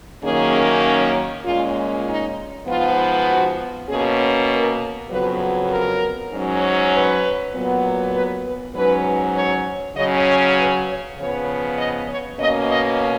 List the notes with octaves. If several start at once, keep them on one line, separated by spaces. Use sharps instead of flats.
F#2 D#3 A#3 C#4 G#4
A#2 G#3 C#4 F4
D#4
G#2 F3 B3 F4
F#4
B2 A#3 C#4 G#4
A#4
F2 C#3 F#3 B3 B4
A#4
G#2 F#3 C#4
B4
A#2 F#3 B3
B4
B4
G#2 F#3 C#4 B4
C#5
C#3 F#3 C#4 D#5
C#5
B4
C#5
C#3 F3 B3 C#5
D#5
C#5
B2 A#3 C#4 D#5
D#5